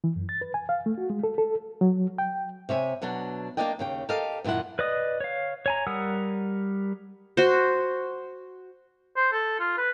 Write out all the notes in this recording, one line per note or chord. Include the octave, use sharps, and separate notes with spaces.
E3
F#2
A6
B4
G#5
F5
A3
F#4
G#3
A4
A4
F#3
G5
C3 C#5 E5 G#5
B2 F#3 D4 F#4
A#3 C#4 D4 D5 D#5 G5
D#2 C#3 G5
G4 A4 A#4 D#5 F5
F#2 A#2 D#3 E4 F#5
B4 D5 D#5 D#6
C#5 F5
C#5 G#5 A#5
G3 A#4 F#5 D#6 E6
F#4 C5
C5
A4
F4
B4